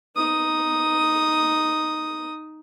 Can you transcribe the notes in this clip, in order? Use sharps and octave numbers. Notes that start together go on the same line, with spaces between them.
D#4 D#6